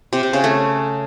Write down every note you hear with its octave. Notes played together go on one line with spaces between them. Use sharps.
C3
C3
C#3
A3